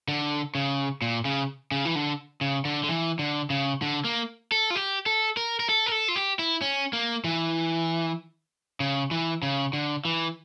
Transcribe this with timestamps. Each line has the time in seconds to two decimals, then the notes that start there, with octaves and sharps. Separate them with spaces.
0.08 D3
0.55 C#3
1.02 A#2
1.25 C#3
1.72 C#3
1.85 E3
1.95 D3
2.41 C#3
2.65 D3
2.83 D3
2.89 E3
3.19 D3
3.50 C#3
3.82 D3
4.05 A#3
4.52 A4
4.70 F4
4.76 G4
5.06 A4
5.37 A#4
5.59 A#4
5.69 A4
5.86 A#4
5.92 A4
6.08 F4
6.16 G4
6.39 E4
6.61 C#4
6.93 A#3
7.24 E3
8.80 C#3
9.11 E3
9.43 C#3
9.73 D3
10.05 E3